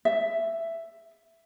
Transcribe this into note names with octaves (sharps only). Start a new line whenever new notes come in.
E5